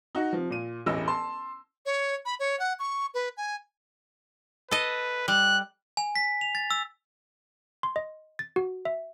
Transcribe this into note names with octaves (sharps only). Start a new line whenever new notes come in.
D#4 F#4
C3 F3
A#2 D#7
E1 A1 E3 D#5 E6
A5 C6
C#5
B5
C#5
F#5
C#6
B4
G#5
A4 B4 D#5
G3 F#6
G#5
B6
F7
A6
E6
C6
D#5
A6
F#4
E5